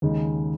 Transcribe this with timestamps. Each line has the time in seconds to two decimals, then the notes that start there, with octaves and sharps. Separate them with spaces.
0.02 D#2 C#3 G#3 D#4